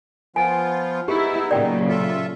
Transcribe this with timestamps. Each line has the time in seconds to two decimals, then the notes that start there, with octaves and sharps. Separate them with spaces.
0.36 F3 B3 F4 G#5
1.08 G#3 B3 D#4 E4 G4
1.51 A#2 C#3 F#3 D5 G5
1.88 F4 A4 E5